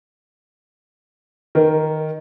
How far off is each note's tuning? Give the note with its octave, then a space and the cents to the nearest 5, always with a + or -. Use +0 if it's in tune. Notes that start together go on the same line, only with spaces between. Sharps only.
D#3 +0 A#4 +0